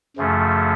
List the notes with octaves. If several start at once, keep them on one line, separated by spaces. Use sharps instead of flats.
F#2 C#3 F3 A3